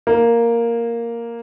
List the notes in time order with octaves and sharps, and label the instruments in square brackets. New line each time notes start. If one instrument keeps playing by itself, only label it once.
[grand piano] A#3